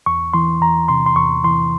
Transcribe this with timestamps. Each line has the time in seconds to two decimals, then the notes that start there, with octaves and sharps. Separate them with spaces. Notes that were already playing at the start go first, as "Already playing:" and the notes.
0.06 E2 C#6
0.34 E3 C6
0.62 E2 A#5
0.88 C3 C6
1.06 C6
1.16 E2 C#6
1.44 E3 C6